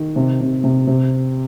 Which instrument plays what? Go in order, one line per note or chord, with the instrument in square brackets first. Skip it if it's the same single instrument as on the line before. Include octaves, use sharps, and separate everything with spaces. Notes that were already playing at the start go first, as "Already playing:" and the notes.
Already playing: [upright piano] D#3
C3
C3
C3
C3